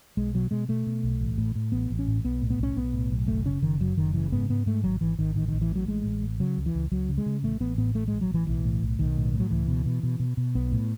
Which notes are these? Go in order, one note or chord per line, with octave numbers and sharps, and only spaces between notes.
B1 G#3
B2 F#3
B2 G#3
B2 A3
B2
B1
A1
A2
A2
A1 B3
A1
C#4
A2
B1 B3
A2
B3
B1 C#4
B1 B3
A2
B1
F#1 A3
C#3 C#4
F#1 D#3
F#2 F#3
F#1 D#3
C#3 E3
G#2 B3
G#2 B3
G#2 A3
G#1 F#3
G#1 E3
G#1 D#3
A1 D#3
D#3
A1
E3
A2 F#3
A1 G#3
A1
A2
C#3 F#3
C#2
E3
C#2
C#2 F#3
C#3
G#3
C#3
A1 A3
A1 B3
A2 B3
A1 A3
G#3
A1
F#3
A1 E3
B1 E3
A2
B1
B1 D#3
A2
A2
F#3
C#2 E3
B2
B2
B2
B2
B2
B1 B3
A2